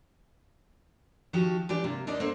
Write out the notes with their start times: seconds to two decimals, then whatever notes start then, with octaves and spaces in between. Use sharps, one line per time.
1.33 D#3 F3 F#4 G4 A5
1.69 E3 D4 G4 D5
1.84 C3 A#3
2.07 D#2 A#3 D4 D#4 D5 D#5
2.20 A#3 A4 C5